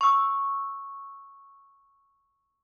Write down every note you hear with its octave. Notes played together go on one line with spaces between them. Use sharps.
C#6 E6